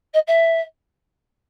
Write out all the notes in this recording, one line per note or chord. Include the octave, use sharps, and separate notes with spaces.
D#5
E5